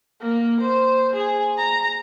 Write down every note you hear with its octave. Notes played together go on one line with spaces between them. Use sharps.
A#3
C5
G#4
A#5